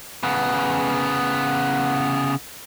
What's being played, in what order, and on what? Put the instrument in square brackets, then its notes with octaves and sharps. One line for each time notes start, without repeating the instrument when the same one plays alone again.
[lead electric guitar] C#3 B3